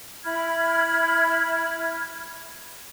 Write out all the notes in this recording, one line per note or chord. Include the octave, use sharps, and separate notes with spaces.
E4 B5 F6 G#6